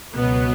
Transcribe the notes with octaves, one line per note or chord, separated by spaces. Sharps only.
C#2 B2 F#3 B3